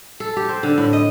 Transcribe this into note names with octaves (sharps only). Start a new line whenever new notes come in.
A4
G4
C4
D3
A2
D#5